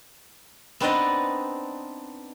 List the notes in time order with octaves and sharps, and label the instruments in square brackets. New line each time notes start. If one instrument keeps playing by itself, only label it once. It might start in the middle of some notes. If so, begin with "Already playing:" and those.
[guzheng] B3 C4 D4 D#4 D5 D#5